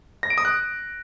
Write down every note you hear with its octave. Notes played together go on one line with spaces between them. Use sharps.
A#6
D7
D#6
F#6